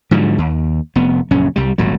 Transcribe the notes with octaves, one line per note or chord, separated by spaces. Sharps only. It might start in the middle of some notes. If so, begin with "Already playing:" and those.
G#2 D3 F3 F#3
D#2
F1 B3
A#1 F#2 C#3 C#4
C2 G3
D#1 G#1 A2 F#3